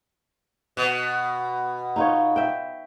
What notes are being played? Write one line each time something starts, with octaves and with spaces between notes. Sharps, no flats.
B2
D#4 F4 C#5
E5 G5